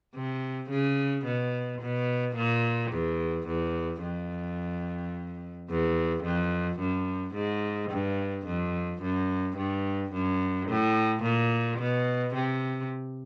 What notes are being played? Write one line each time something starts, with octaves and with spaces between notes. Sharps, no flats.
C3
C#3
B2
B2
A#2
E2
E2
F2
E2
F2
F#2
G#2
G2
F2
F#2
G2
F#2
A2
A#2
B2
C3